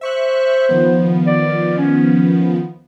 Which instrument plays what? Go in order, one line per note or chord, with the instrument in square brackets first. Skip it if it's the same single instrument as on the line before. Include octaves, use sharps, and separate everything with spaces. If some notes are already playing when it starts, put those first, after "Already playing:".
[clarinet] C5 [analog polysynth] E5 C#6 F#6
[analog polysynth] D#3 F3 B3
[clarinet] D5
C#4